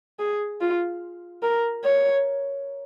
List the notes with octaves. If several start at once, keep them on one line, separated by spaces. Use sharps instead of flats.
G#4
F4
A#4
C#5